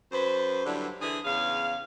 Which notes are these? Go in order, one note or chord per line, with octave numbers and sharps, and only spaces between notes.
F#2 B4 C5
G2 D3 F#3 D4 E4
D3 E3 G#4
E2 C#3 F5